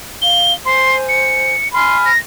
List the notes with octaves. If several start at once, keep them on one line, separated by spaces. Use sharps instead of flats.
F5 G7
C5 G#5 C6
C#7
G#5 B5 C6 F6
A#6